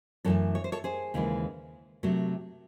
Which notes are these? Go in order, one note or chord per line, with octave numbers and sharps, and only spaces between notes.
F#2 E3 A3 A4 C#5
C#5
C5
A4 C#5
G#4 C5
D#2 C#3 E3 G#3
C3 F#3 A3